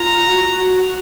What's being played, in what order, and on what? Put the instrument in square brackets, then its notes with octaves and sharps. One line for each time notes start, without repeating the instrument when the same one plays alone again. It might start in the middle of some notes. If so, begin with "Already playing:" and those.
Already playing: [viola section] F4 [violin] A#5
[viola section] F#4